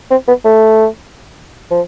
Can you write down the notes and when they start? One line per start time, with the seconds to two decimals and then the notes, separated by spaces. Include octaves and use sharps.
0.10 C4
0.27 B3
0.44 A3
1.70 F3